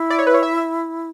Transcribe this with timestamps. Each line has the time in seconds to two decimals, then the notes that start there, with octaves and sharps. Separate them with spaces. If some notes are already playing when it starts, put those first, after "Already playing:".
Already playing: E4
0.10 D5
0.19 C#5
0.27 B4
0.34 C#5
0.43 E5